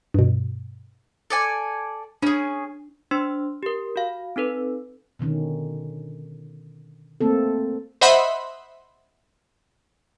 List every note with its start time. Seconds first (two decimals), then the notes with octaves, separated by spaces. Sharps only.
0.14 G2 B2
1.30 A4 D5 G#5
2.22 C#4 D4 G#4
3.11 D4 C5 C6 E6
3.63 G4 A#4
3.96 F#4 F5
4.36 C4 D#4 A4 B4
5.19 B2 D3 D#3 C#4
7.21 A3 A#3 C4 A4
8.01 C5 D#5 E5 F#5 B5 C6